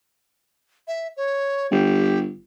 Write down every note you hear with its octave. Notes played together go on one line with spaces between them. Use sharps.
E5
C#5
G1 G4